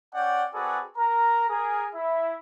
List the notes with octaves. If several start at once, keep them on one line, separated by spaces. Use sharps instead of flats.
C#4 D5 F#5 G5
C4 F#4 G#4 A4 B4 D5
A#4 A#5
G#4 A#4
E4 E5